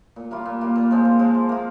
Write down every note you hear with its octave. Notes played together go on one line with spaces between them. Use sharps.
A#2
G3 A#3 F4
A#2
G3 A#3 F4
A#2
F3 G#3 C4
A#2
F3 G#3 C4
F3
A#3 F4